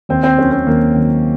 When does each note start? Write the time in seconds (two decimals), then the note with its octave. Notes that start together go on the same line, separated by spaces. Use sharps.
0.09 D#2 C4
0.23 C4
0.37 D#3 F#3 C#4
0.51 C4
0.66 D#2 A#3
0.94 D#3 F#3